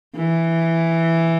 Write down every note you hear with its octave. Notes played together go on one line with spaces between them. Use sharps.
E3